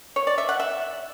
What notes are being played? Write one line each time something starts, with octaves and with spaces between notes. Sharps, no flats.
C#5
D5
E5
F#5
E5